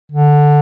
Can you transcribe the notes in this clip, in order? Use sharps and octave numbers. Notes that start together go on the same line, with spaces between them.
D3